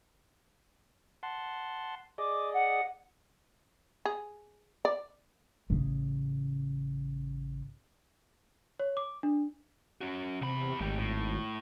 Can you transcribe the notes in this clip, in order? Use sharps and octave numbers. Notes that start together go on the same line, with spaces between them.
F#5 A5 C6
G#4 D5 D#5 D6
F#5
G#4
D5
A1 C#3
C#5
D6
D4
C#4 F#4
E2 C3 B5
G#1 A3 G4
A2